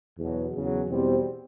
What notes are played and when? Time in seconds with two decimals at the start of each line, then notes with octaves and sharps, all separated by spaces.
0.18 E2 B2 F#3
0.53 E2 C#3 F#3
0.88 E2 B2 G3 C4